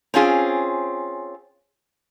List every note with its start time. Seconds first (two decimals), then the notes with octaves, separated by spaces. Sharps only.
0.14 C4 C#4 F4 G#4